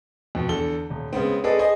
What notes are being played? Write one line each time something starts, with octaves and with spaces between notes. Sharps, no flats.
F2 B2
E2 D3 A4 G7
D#1
C#3 G#3 B3 C4
C4 G#4 A4 B4 D5 D#5
G#4 C5 D#5 G#5